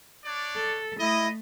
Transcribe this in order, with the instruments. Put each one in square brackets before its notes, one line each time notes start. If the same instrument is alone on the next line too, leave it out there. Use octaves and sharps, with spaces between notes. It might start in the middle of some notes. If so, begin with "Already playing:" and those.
[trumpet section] D4 C#5 D5
[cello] A4
[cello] A3 [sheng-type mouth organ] E4 [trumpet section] D#5